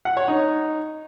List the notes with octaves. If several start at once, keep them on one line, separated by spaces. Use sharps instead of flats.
F#5
C#5
D#4